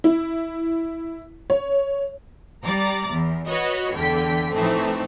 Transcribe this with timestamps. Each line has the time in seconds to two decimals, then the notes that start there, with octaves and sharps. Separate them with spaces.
0.04 E4
1.50 C#5
2.64 G3 D5 A#5 D6 A6
3.08 E2
3.48 F#4 B4 C#5 D#5
3.94 E2 D3 G5 B6
4.53 A2 E3 F3 A3 C4 D#4